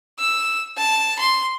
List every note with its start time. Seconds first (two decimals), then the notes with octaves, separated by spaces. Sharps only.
0.19 E6
0.77 A5
1.20 C6